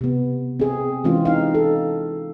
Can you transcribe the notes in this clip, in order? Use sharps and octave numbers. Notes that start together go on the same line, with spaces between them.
C3 B3
C4 G#4
E3 G#3 C4 C#4 F4
D#4 F5
A4